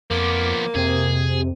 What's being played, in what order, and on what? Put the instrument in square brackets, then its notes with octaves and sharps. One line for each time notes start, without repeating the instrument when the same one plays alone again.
[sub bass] F2 [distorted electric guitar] F3 B3 [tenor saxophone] A#3 [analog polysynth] D6
[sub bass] F2 [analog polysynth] C3 [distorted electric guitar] G#4